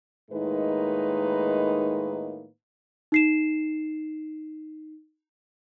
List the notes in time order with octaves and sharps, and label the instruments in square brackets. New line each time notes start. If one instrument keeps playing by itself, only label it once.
[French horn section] A2 D#3 G#3 A#3 D#4 B4
[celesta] D#4 C7 E7